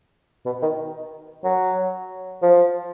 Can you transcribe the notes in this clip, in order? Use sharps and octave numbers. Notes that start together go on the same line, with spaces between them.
B2
D#3
F#3
F3